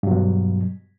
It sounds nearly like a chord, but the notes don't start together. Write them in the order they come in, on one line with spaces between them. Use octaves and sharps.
G2 F#3 B2